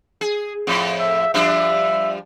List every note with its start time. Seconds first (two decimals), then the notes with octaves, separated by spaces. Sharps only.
0.21 G#4
0.67 F2 A2
1.00 E5
1.34 F3 G3 D4 E5